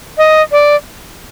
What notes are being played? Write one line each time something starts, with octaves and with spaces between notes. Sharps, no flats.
D#5
D5